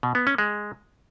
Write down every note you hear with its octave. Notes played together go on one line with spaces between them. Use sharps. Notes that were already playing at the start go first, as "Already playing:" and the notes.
B2
B3
C#4
G#3